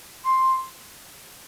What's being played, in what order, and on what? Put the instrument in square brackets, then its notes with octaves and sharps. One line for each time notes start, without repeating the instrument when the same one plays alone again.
[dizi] C6